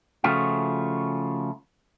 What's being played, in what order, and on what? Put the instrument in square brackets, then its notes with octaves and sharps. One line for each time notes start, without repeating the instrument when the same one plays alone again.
[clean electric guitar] C#3 F3 A3 C#4 F4 F#4